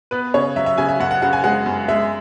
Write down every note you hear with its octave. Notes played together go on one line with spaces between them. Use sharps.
B3 B4
C#3 C#5
F#3 E5
E5
C#3 G#5
E5
F#2 F#5
F#5
C#3 F#5
G#5
G#3 F#5
F#2
G#3 E5